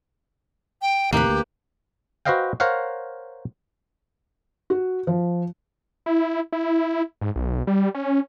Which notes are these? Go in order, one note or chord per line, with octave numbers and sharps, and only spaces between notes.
G5
D#2 A2 C3 A#3 G4 B4
D2
F#4 B4 C5 D#5 F5 G5
A#4 C5 C#5 F5 F#5
F#4
F3
E4
E4
G#2
B1
G3
C#4